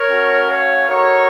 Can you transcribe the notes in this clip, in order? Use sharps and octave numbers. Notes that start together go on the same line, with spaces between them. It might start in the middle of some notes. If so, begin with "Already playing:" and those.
Already playing: A#4 C#5
A3 C#4 F#4
C#5 F5
A3 D#4 F#4 A#4 C#5